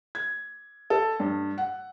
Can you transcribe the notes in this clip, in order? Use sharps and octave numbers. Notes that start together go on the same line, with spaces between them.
G#6
A4
G2
F#5